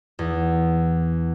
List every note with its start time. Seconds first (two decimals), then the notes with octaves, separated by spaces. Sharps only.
0.19 E2